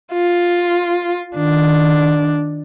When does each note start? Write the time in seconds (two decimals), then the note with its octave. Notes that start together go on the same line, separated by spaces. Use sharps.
0.13 F4
1.37 D#3 D4